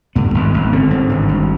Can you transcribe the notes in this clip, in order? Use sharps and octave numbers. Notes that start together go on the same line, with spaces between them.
G2 B3
G#1
G#1
D3 C4
G2
G#1
G#1